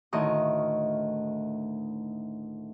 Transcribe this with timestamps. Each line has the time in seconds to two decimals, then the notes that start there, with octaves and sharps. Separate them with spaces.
0.13 D2 A2 D#3 C#5 C#6 D#6